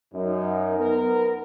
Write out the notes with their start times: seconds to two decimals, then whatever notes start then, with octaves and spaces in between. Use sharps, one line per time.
0.14 F#2 D#4 A#4
0.78 B3 A#4